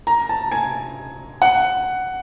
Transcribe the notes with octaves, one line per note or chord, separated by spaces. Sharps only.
A#5
A5
G#5
F#5